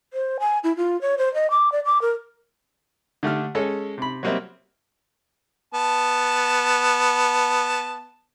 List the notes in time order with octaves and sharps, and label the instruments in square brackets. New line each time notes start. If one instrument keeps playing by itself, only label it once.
[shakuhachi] C5
G#5
E4
F4
C#5
C5
D#5
D6
D5
D6
A#4
[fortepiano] D3 A3 G4 F6
G#3 C#4 A4 C#5
C3 B5
F#3 G3 A#3 C4 D#5 E5
[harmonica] B3 A5